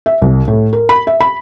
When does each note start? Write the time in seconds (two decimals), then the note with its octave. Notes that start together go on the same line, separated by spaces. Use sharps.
0.06 E5
0.22 C2
0.48 A2
0.73 A#4
0.89 B5
1.07 E5
1.20 B5